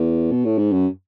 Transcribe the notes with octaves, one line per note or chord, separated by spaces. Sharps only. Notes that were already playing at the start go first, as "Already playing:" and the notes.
Already playing: E2
B2
A2
G#2
F#2